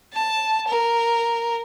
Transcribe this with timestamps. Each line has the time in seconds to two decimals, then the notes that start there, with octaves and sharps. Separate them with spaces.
0.13 A5
0.68 A#4